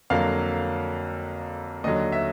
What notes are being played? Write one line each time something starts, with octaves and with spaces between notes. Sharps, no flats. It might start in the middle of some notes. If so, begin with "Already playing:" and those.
F2 D3 F#3 A#3 F5
D#2 D3 F#3 D#5
E5